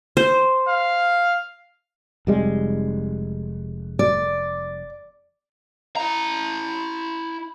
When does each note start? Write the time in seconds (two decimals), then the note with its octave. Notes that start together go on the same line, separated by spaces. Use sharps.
0.17 C5
0.68 F5
2.27 F1 G3 G#3
3.99 D5
5.96 E4 A#5